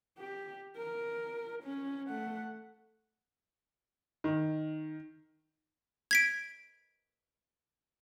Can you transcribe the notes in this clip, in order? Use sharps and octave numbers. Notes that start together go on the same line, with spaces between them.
G4
A#4
C#4
A3 F#5
D#3
G#6 B6 D7